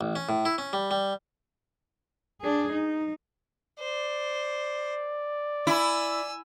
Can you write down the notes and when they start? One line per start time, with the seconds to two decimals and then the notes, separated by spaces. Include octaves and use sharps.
0.01 A1
0.16 C#4
0.29 A2
0.45 E4
0.58 C#4
0.73 G3
0.91 G3
2.41 D4 G#4
2.72 D#4
3.79 C5 D5
5.67 E4 G#5 E6